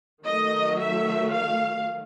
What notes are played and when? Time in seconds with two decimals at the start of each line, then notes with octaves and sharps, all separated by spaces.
0.25 D#3 F#3 A3 D#5
0.78 E5
1.32 F5